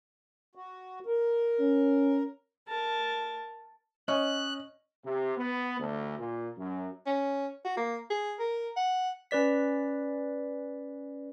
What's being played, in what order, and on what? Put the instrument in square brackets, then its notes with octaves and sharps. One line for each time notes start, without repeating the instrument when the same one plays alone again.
[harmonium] F#4
A#4
[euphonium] C#4
[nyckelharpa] A#4 A5
[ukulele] C#4 [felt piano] D#5 [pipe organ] F#6
[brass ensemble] C3
B3
D2
A#2
F#2
[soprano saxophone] C#4
F#4
A#3
G#4
A#4
F#5
[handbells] C#4 B4 D5 B6